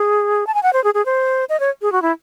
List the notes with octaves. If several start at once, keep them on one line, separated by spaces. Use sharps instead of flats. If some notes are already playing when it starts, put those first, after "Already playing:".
Already playing: G#4
A5
G#5
F#5
C5
G#4
G#4
C5
D#5
C#5
G#4
F#4
E4